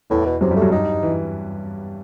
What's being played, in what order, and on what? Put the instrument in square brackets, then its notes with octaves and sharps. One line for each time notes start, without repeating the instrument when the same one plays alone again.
[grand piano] E2 E3 [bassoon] A2
[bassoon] B2
[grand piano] F#2 F#3 [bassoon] C3
[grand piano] G2 G3
[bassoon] A3
[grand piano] F#2 F#3
[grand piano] G2 G3 [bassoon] D#4
[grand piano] E3